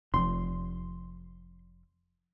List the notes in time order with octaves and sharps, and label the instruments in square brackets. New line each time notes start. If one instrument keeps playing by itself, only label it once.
[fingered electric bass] F1 F2 [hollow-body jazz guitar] C6